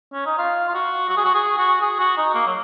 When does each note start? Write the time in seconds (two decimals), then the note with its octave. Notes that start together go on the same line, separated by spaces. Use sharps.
0.13 C#4
0.26 D#4
0.38 F4
0.68 F4
0.74 F#4
1.09 F#4
1.17 G#4
1.24 F#4
1.34 G#4
1.58 F#4
1.82 G#4
1.99 F#4
2.17 D#4
2.34 A#3
2.47 F#3